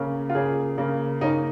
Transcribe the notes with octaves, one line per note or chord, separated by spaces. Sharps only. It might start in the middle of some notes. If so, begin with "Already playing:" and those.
Already playing: C#3 A#3 C#4
F4
C#3 A#3 C#4 G#4
C#3 A#3 C#4
C#3 A#3 C#4 D#4